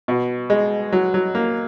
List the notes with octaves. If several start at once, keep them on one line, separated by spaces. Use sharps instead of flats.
B2
G#3
F#3
F#3
A#3